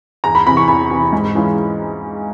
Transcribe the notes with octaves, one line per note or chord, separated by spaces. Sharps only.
E2 A#5
B5
C3 E3 B5
C#6
E2 B5
C3 E3
G#2
E3 G#3 C#4 F4